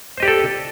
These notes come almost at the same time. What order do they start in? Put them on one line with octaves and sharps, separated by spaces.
C5 D#5 G4 D5 A4